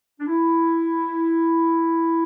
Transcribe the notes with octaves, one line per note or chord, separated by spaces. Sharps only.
D4
E4